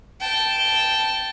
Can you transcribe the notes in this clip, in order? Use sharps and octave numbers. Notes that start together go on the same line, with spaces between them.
G5 A5